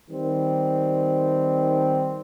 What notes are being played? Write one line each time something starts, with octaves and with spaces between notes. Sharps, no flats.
D#3 G3 C4